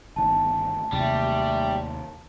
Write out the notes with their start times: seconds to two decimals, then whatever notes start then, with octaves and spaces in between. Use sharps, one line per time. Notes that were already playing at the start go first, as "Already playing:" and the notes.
0.16 G1 D#3 A3 A5
0.92 D#2 C3 G3 A3